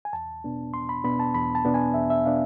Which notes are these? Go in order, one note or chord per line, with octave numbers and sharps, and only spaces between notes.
G#5
E2 A5
B2 B3 D4
E2 C6
B5
B2 B3 D4 B5
A5
E2 B5
A5
B2 B3 D4
G#5
E2 E5
E5
B2 B3 D4 F5